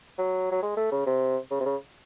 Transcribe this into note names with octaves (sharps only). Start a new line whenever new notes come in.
F#3
F#3
G#3
A3
C#3
C3
C#3
C3
C#3